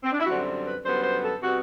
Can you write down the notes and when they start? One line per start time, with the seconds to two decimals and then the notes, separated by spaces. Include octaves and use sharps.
0.04 C4
0.12 D4
0.20 E4
0.26 F#2 D3 G3 C4 F#4
0.66 B4
0.85 F#2 D3 G3 B3 C5
1.04 C5
1.24 A4
1.43 C3 G3 B3 F#4